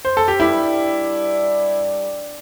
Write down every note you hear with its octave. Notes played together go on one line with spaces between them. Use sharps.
C5
A4
G4
G2 G3 D4 E4